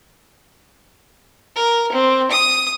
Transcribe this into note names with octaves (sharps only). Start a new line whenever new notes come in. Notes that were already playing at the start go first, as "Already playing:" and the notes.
A#4
C4
D#6